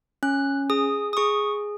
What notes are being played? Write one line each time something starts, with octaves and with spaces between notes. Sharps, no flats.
C#4 F#6
G#4 D#6
D#6
G#4 C#6